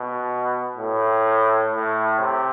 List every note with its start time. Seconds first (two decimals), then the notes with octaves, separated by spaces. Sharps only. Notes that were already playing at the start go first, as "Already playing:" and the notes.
Already playing: B2
0.76 A2
1.72 A2
2.20 C3